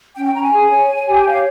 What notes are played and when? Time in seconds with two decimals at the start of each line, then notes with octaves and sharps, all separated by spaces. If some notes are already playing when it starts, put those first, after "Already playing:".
0.15 C#4 G5
0.26 G5
0.35 C#4 A#5
0.43 G#5
0.53 G#4
0.70 C#5
0.90 C#5
1.08 G4
1.26 C#5 F5